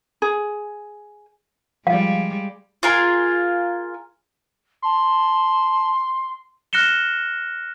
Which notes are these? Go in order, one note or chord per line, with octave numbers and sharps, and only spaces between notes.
G#4
F3 G3 G#3 F5
F4 G#4 A#4
A5 C6
F6 F#6 A#6 C#7 E7 G7